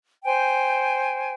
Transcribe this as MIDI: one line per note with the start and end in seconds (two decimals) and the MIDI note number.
0.23 1.33 72
0.23 1.33 79
0.23 1.33 80